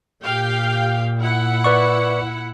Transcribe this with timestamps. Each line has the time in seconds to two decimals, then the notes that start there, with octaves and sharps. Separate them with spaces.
0.24 A#2 G4 F5 G5
1.21 E4 F#5
1.64 B4 D5 C#6